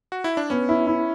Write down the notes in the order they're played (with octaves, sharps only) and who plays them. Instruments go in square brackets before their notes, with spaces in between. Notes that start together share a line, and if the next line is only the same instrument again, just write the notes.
[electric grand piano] F#4
E4
D4
[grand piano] B3 [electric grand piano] C#4
[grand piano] E4
E4